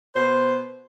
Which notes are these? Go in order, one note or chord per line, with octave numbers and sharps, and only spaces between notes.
B2 C5